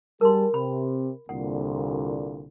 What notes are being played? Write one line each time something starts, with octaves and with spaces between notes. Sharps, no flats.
G3 G#4 A#4 A5 C6
C3 B5
C2 A#2 D3 F#5